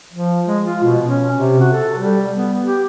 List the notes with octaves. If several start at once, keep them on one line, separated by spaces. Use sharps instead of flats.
F3
G#3
F4
B2
C#4
C3
F#4
A4
G3
B3
G4